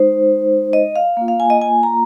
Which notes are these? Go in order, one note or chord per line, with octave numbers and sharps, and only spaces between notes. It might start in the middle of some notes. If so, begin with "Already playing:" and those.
Already playing: G#3 D#4 C5
D#5
F5
A#3 F4
F5
G#5
D#5
G#5
A#5